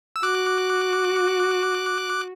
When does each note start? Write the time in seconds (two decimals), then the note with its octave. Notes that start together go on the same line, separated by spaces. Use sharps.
0.16 E6
0.23 F#4 D6 F#6